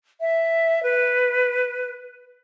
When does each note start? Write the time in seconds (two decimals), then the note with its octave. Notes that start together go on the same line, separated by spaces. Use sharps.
0.21 E5
0.83 B4